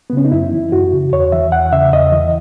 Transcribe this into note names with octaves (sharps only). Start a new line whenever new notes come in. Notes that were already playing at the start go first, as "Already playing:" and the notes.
B3
C#3 C#4
D#4
F#2 E4
E3
F#2 F#4
C#3
E2 C#5
E3 E5
E2 F#5
C#3 E5
E2 D#5
E3